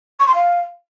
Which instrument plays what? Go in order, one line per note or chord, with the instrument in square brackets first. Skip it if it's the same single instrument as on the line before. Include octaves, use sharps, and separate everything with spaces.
[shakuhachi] C#6
C6
F5